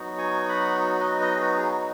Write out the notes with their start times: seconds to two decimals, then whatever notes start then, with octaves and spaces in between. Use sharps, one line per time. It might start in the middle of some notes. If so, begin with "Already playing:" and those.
Already playing: F#3 B3 D#4 F#4
0.18 G#5 C#6
0.49 F#5 B5
1.00 B4 D#5
1.20 B4 D#5
1.35 G#4
1.41 F#4 B4
1.57 G#4
1.72 F#4